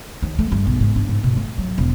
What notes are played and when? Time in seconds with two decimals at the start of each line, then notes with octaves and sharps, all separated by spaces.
0.22 D#2
0.39 A3
0.52 G2
0.67 B1
0.80 G#2
0.96 D4
1.09 G#2
1.24 B2
1.37 A3
1.58 F#3
1.78 E1